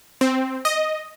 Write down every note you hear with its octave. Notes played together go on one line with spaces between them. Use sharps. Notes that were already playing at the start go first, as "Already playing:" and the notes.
C4
D#5